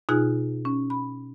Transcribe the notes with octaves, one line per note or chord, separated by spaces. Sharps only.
B2 D#4 F4 G#4 G#5 F#6
C#4
B5